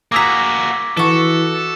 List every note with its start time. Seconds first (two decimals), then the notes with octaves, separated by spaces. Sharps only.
0.12 A#3 F#4 G#4 A#5 D6 E6 B6
0.97 E3 F#4 A4 E5